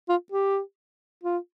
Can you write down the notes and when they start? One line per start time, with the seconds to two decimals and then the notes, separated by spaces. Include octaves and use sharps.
0.09 F4
0.32 G4
1.23 F4